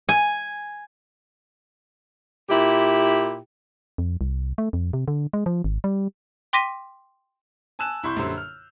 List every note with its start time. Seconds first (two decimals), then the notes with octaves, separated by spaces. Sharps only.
0.09 G#5
2.50 A#2 E4 G4
3.98 F2
4.21 C2
4.58 A3
4.73 F2
4.93 C3
5.08 D3
5.33 G#3
5.46 F3
5.64 G#1
5.84 G3
6.53 G5 C6 D6 A#6 B6 D#7
7.79 G#5 A5 E6 F#6 E7
8.03 C2 E4 C6 C#6 E6 G6
8.16 A#1 F#2 D3 G3 C5 C6
8.37 F6